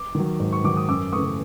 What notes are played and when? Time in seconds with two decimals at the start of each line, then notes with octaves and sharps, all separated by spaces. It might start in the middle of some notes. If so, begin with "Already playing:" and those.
Already playing: D6
0.15 D#3 F#3
0.40 G#2
0.53 C#6
0.64 D#3 F#3 D6
0.77 D#6
0.89 F#2 D6 E6
1.12 C#3 E3 A3 C#6 D#6